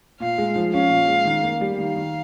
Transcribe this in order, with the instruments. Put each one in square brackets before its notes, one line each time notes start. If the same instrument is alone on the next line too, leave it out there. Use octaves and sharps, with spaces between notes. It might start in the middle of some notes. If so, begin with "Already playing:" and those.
[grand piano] A#2 [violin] F5
[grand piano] G#3
F3
[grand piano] C#4 [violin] F5
[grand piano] A#2
G#3
D#3
A#3
G3
[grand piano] D#3 [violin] F5
[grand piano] D#3